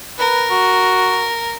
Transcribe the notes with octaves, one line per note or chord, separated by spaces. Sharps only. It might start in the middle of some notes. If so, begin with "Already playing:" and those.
A#4 B4
F#4